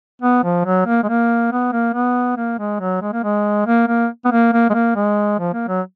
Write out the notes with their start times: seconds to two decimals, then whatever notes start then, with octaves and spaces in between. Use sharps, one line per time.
0.22 B3
0.43 F3
0.65 F#3
0.86 A#3
1.03 G#3
1.08 A#3
1.52 B3
1.72 A#3
1.94 B3
2.37 A#3
2.58 G#3
2.80 F#3
3.02 G#3
3.12 A#3
3.23 G#3
3.66 A#3
3.87 A#3
4.25 B3
4.31 A#3
4.53 A#3
4.70 G#3
4.74 A#3
4.95 G#3
5.39 F3
5.53 A#3
5.68 F#3